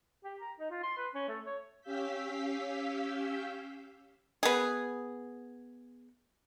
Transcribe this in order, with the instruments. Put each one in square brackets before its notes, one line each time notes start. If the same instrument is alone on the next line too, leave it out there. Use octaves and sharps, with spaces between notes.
[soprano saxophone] G4
A#5
D#4
F4
C6
B4
C#4
A3
C#5
[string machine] C#4 G4 F5 E6 G6 B6
[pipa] B3 G#4